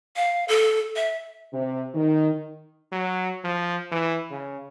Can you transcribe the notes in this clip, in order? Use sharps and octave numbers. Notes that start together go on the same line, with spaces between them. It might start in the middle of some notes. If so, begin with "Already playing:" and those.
F5
A4
E5
C3
D#3
F#3
F3
E3
C#3